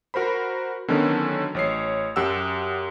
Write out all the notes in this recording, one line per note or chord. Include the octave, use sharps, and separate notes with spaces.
F#4 A#4 C5 B5
D3 D#3 F#3 B3 C#4
A1 C#5 C7
F#2 G4 F#5 E6